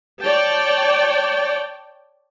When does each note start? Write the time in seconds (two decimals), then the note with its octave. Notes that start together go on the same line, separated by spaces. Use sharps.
0.21 C#5 D5 G5 A5